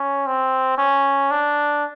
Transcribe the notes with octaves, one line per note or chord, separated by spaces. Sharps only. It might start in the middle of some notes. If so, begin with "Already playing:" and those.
Already playing: C#4
C4
C#4
D4